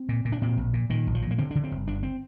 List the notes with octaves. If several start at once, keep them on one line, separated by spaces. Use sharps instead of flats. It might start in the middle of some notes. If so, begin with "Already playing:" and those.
Already playing: C4
A#2
A#2
D4
A#2 C4
A#1
A#2
A#2 D#3
A#1
F3
A#2
A#3
D3 C4
D3 D4
C4
G1
G1 D4
C4